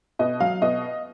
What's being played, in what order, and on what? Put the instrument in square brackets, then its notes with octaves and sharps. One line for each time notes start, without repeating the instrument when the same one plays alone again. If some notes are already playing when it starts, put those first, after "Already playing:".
[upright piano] B2 D#5
F#3 F5
B2 D#5